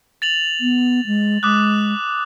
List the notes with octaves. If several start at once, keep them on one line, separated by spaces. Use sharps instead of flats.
A6 F7 F#7
B3
G#3
G#3 D6 D#6 F#6